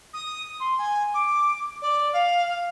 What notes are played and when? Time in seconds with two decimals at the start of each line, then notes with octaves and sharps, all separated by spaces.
0.13 D#6
0.60 C6
0.78 G#5
1.14 D6
1.82 D5
2.13 F5